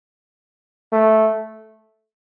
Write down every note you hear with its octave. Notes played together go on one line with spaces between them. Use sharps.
A3